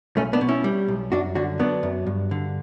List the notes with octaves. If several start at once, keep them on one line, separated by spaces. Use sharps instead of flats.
B1 A3 C#4
B3 D4
B2
C#4 E4
G3
B1
F#2 D4 F#4
D3 D4 F#4
F#3 B3 D4
F#2
G2
D3